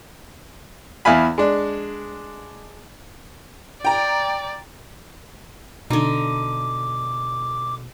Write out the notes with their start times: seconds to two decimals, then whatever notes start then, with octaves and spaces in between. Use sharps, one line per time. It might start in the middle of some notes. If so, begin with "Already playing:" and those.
1.05 E2 E4 F5 G#5 B5
1.38 G#3 D4
3.85 D5 G5 A#5
5.90 B2 D3 D#4 D6